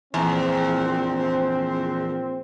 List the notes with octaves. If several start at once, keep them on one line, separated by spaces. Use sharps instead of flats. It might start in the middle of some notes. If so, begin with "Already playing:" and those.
A#1 E2 C4